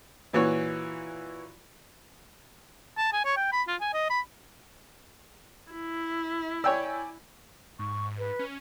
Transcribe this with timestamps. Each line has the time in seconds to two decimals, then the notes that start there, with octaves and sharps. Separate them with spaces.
0.33 A#2 E3 F#4 C#5
2.97 A5
3.13 G#5
3.25 C#5
3.37 G5
3.52 B5
3.68 F4
3.81 G#5
3.93 D#5
4.10 B5
5.72 E4
6.64 C#5 D5 G5 G#5 E6
7.79 G#2 C#6
8.18 B4
8.39 C#4